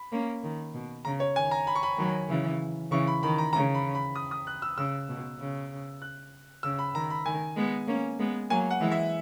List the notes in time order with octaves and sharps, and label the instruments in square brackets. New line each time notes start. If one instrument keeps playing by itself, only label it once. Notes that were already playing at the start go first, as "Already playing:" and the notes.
Already playing: [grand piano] B5
[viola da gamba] A#3 C#4
D#3
B2
[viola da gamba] C#3 [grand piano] A#5
[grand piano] C#5
[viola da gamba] D#3 [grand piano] G#5
[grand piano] A#5
B5
C#6
B5
[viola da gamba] D#3 F#3
C#3 E3
[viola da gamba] C#3 E3 [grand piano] C#6
[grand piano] B5
[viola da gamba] D#3 [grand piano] B5
[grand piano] A#5
[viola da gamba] C#3 [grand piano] A#5
[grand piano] B5
B5
D#6
D#6
F#6
E6
[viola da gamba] C#3 [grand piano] E6
[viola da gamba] B2
C#3
[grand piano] F#6
[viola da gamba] C#3 [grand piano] E6
[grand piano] B5
[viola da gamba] D#3 [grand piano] A#5
[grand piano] B5
[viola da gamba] D#3 [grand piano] G#5
[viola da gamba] G#3 B3
A#3 C#4
G#3 B3
[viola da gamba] F#3 A#3 [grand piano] G#5
[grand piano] F#5
[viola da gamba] E3 G#3
[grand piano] E5